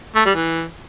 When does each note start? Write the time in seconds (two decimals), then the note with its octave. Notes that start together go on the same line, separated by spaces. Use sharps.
0.15 A3
0.25 G3
0.35 E3